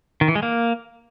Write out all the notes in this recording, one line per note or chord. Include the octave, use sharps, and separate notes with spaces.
D#3
E3
G#3
A#3